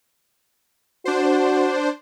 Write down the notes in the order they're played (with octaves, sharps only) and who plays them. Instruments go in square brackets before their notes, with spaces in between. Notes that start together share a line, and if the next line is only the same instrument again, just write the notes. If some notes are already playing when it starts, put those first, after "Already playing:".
[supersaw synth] D4 C5 [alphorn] F#4